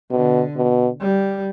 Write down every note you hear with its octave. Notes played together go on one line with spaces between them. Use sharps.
B2 D3
B2
G3